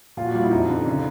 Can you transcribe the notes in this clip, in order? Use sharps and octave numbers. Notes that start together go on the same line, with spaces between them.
A#2 F4
F#4
G3 F4
E4
F2 D#4
D3
C#3